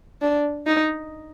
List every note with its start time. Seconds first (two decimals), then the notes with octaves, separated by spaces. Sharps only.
0.21 D4
0.67 D#4